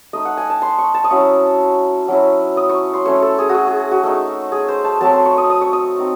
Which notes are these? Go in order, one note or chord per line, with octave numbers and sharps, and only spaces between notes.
A3 D#4 D#5
F#5
G#5
A5
C6
C#6
A5
D#6
F#3 C#4 E4 C#6
F#3 C#4 E4
D#6
C#6
C6
A3 C#4 E4 C#5
A4
G#4
F#4
G#4
G#4
F#4
A3 D#4
G#4
C5
A5
F#3 A3 C4 A5
C6
C#6
D#6
D#6
C#6
D#6
C4 D#4